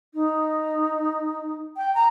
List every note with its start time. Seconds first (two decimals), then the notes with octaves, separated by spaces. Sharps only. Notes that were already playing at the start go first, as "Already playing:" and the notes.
0.14 D#4
1.76 G5
1.94 A#5